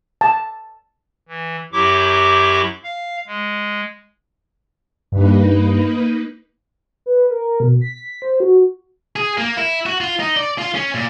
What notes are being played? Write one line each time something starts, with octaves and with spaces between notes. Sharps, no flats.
A5
E3
F#2 F#3 E4 G4 C#6 D6
F5
G#3
G2 A#3 D#4 B4
B4
A#4
B2
B6
C5
F#4
G#4
A#3
E4
F#4
F4
D#4
D5
F4
C#4
A#2